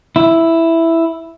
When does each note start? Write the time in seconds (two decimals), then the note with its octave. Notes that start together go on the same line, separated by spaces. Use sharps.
0.16 E4